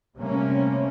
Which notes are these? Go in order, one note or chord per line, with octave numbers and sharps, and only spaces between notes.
C3 G3 A3 A#3 C#4